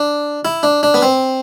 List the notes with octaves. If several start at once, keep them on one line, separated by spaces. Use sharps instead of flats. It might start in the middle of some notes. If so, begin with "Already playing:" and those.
Already playing: D4
E4
D4
D4
B3
C4